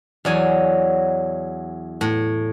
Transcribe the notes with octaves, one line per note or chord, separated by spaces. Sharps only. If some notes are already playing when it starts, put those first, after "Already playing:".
E2 F#3 C#5 D5 G#5
A2